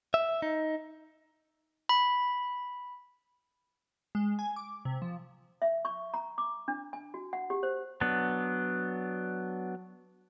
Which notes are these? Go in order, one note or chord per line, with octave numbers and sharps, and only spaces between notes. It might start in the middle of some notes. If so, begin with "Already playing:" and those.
E5
D#4
B5
G#3
G#5
D6
C3
F3
E5
C#6
A#5
D6
D4
G#5
F#4
F#5
G4
C5
F#3 B3 D4